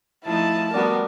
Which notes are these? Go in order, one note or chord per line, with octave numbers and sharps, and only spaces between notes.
F3 A3 D#4 E4 A5
G3 B3 D4 F#4 A#4 D#6